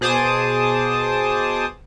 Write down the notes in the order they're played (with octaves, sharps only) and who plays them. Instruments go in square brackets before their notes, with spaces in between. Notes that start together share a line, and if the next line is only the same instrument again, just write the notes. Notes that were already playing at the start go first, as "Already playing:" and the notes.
[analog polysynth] B2 G#4 C5 A5 D6 D#6